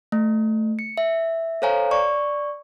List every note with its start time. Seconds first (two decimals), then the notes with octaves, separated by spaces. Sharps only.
0.12 A3
0.79 C#7
0.98 E5
1.62 A4 C5 C#5 F5 G#5 A#5
1.91 D5 C#6